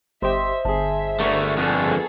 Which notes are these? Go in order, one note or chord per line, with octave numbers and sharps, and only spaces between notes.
G1 G4 C5 D#5 E5
G1 G#4 E5 A5
D3 A3 A#3 C#5
F2 D3 B3 G#4 A4